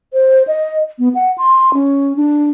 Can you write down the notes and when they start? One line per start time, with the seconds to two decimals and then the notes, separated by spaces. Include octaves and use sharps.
0.13 C5
0.47 D#5
0.99 B3
1.15 F#5
1.38 C6
1.74 C#4
2.17 D4